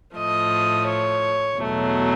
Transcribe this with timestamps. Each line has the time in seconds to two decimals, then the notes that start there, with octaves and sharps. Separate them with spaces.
0.16 A2 F3 A3 D#5
0.87 C#5
1.59 E2 B2 F#3 A3